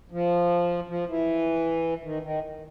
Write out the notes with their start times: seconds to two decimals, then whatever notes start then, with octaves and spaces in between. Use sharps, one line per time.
0.11 F3
0.87 F3
1.08 E3
2.03 D#3
2.22 D#3